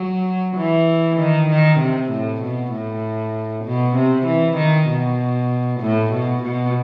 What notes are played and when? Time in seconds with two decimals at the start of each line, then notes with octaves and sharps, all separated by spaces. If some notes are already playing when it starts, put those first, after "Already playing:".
Already playing: F#3
0.57 E3
1.19 D#3
1.49 D#3
1.80 C3
2.11 A2
2.42 B2
2.72 A2
3.65 B2
3.96 C3
4.26 E3
4.57 D#3
4.88 B2
5.81 A2
6.12 B2
6.43 B2